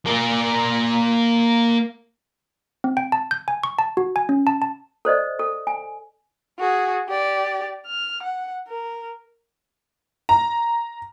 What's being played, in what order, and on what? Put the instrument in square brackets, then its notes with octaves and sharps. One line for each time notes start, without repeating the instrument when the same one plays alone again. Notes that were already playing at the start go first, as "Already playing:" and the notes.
[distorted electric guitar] A#3 D5
[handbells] C4
G5
A5
G6
G#5
C#6
A5
F#4
G#5
C#4
A5
A5
[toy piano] A4 C5 D5 D#5
A4
G#5
[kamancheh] F#4 G#4
G4 D5
F6
F#5
A#4
[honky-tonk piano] A#5